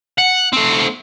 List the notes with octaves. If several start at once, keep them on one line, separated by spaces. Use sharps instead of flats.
F#5
A3 C4